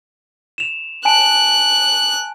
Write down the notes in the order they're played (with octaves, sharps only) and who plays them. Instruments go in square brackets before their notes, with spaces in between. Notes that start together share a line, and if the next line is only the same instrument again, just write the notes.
[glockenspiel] E7 F7
[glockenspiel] G#5 A5 D7 [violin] F#6